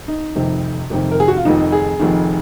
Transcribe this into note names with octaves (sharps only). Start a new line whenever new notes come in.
D#4
F1 F2 C3 D#3
F1 F2 C3 D#3
A#4
G#4
F#4
F4
F1 F2 D#3 D#4
G#4
F1 F2 D#3